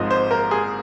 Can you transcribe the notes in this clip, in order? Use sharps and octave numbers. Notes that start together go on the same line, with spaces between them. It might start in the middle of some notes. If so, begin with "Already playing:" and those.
Already playing: G#1 G#2 F3 G#3 D#5
C5
A#4
G#4